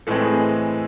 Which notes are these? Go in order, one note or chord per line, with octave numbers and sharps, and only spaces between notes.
A2 E3 G#3 C4 A4
G#4